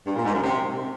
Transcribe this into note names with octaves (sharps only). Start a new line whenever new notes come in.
G2
A#2
G#2
F#2
C3